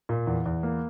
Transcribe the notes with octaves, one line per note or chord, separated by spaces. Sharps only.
A#2
E2
E2
A#3